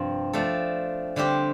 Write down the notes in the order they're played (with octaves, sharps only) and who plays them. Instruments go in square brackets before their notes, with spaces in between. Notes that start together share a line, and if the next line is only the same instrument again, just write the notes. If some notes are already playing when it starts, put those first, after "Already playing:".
Already playing: [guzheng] G2 C3 F3 C4
F3 A3 D4 A4
D3 G3 C4 G4